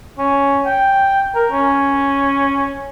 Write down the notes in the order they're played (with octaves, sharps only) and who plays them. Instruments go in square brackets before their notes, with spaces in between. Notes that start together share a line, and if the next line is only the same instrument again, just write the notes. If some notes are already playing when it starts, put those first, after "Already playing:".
[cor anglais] C#4
G5
A#4
C#4